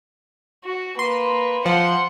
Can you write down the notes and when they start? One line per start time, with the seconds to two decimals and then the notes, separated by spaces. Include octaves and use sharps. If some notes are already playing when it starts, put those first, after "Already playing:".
0.65 F#4
0.99 A#3 B4 C6
1.66 F3 F#5 C6